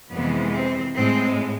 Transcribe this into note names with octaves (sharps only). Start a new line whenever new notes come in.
F2 C3 E3 G#3 B3
C4
A2 G#3 C4